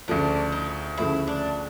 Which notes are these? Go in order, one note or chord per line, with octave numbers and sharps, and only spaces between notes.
D2 C#3 F3 A3 D4
D#4
D2 C#3 F3 A3 E4
D4